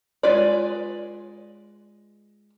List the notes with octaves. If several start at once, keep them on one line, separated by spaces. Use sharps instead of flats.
G#3 F4 B4 C#5 D5